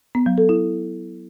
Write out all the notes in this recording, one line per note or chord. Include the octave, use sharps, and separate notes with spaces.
B3
F#3
A4
E4